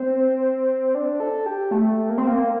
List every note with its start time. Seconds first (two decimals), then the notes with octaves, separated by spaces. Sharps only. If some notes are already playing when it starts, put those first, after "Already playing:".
Already playing: C4
0.95 D4
1.20 A4
1.46 G4
1.71 A3
2.09 A#3
2.18 C4
2.27 A#3